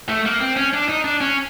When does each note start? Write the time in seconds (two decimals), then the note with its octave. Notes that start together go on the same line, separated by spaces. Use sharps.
0.09 A3
0.25 A#3
0.41 C4
0.56 C#4
0.74 D4
0.88 D#4
1.04 D4
1.21 C#4